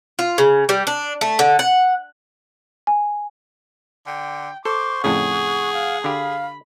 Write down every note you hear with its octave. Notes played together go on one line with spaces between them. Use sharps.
F4
C#3
G3
D4
A3
D3
F#5
G#5
D3 G5
A4 C5 C#6 D6
F2 A2 C#3 G#4 F#5
F5
D3 G4 F5 B5